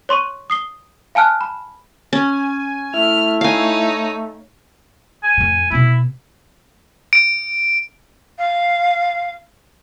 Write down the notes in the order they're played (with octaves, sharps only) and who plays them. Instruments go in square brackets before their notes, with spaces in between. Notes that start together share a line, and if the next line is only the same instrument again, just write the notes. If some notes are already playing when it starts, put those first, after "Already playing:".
[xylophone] C#5 C6 C#6 D#7
D#6 C7 G7
F5 G#5 A5 F6 F#6
B5
[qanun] C#4 [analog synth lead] G#5
[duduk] A3 [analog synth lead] E4 [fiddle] F6
[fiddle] D#4 C#5 [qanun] F5 G#5
[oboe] G#5
[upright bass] F2 A2
[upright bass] B2 B3 [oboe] E4
[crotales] D7
[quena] F5